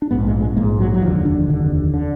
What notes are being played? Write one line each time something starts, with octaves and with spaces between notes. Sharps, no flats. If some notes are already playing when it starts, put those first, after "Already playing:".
D4
A#1 G#2 B3
G#3
G#3
A#1 G#2 A#3
F#3
F#3
F1 D#2 D3 F3
D4
F1 D#2 D3
D3